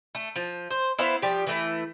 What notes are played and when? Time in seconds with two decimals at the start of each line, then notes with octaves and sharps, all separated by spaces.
0.15 A3
0.36 F3
0.70 C5
0.99 B3 E4 C5 F5
1.22 F3 G3 G4
1.47 E3 A3 E4